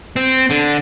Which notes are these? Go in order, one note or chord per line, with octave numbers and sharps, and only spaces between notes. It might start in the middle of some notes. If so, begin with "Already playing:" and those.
C4
D3